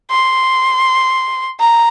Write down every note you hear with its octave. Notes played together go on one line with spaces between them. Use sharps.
C6
A#5